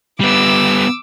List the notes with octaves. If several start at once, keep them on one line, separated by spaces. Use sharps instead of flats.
G3 B3 D6 E6